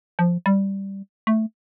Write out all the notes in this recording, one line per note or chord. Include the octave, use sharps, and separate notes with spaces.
F3
G3
A3